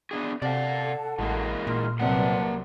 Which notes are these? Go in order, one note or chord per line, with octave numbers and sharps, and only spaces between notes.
B3 D4 G#4
C3 A4 D5 F5 F#5 A5
A1 E3 G#3 A#3
A#2 C6 F6
C2 C3 F#3 A#3 B4 D5 F#5 A5